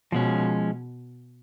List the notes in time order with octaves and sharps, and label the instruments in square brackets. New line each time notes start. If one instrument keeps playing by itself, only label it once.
[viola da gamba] B2 [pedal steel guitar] F3 G#3 C#4